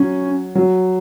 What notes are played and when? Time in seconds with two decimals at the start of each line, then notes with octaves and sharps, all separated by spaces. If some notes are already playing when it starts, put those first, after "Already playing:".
Already playing: F#3 C#4
0.55 F#3